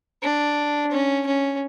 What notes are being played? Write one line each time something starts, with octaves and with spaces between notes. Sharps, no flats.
D4
C#4
C#4